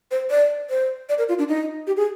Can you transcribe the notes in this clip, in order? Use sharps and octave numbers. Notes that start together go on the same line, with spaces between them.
C5
D5
C5
D5
A#4
F4
D4
D#4
G4
G#4